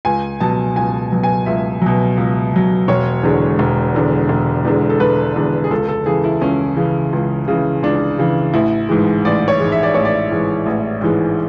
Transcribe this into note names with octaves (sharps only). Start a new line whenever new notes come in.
C#2 G#5
B2 F#3 A5
C#2 G#5
B2 F#3
G#5
C#2 E5
B2 F#3
C#2
B2 F#3
E1 C#5
E2 D3 G#3
E1
E2 D3 G#3
E1
E2 D3 G#3
A4
E1 B4
E2 D3 G#3
G#4
C#2 A4
A4
C#3 E3 G#4
E4
C#2 C#4
C#3 E3
C#2
C#3 E3
C#2 D4
C#3 E3
A1 E4
G#2 E3 G#3
A1 D5
C#5
G#2 E3 G#3
E5
D5
A1 C#5
D5
G#2 E3 G#3
A1
G#2 E3 G#3